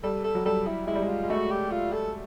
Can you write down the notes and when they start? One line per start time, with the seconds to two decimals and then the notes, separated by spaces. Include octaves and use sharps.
0.03 G3 A4
0.24 A4
0.35 F#3
0.46 G3 A4
0.67 E4
0.87 G#3 E4
0.95 G3
1.02 G#3
1.09 F4
1.23 G#3
1.29 A3 F#4
1.51 G4
1.71 F4
1.93 A4